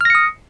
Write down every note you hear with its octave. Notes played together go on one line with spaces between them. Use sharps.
D#6 F6 A#6 C#7